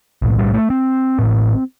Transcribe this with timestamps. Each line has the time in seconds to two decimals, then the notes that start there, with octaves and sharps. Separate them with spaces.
0.22 B1 A2
0.39 G3
0.54 A3
0.70 C4
1.19 A1 A2